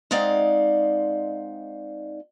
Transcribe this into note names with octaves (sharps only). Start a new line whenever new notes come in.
G#3 C4 D#4 D5 F5 F#5